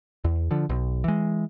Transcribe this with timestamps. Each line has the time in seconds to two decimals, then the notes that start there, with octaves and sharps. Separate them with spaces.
0.25 E2
0.51 D3 F3
0.69 B1
1.04 E3 G#3